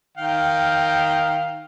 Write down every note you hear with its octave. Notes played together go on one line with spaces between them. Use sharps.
D#3 F5 G5